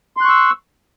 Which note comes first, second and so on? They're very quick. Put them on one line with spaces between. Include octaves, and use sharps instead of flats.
C6 F#6 C#6 E6